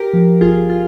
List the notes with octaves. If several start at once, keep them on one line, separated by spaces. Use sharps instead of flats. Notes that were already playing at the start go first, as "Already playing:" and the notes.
Already playing: G4 A#4
F3
G1 F4 G#4
F4